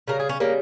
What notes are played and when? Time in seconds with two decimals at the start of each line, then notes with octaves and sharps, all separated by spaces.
0.08 C#3 G3 A#4
0.19 G#4
0.29 C#4
0.40 C#3 G3 A#3